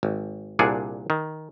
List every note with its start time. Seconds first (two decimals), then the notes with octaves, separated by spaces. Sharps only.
0.03 G#1
0.59 C2 A#2 D4 G#4 F#5
1.10 D#3